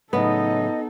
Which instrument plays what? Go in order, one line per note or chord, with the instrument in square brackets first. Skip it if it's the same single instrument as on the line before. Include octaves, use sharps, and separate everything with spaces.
[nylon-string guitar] A2 C#3 F#3 [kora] B3 [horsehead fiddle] D#4 A4 [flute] D#5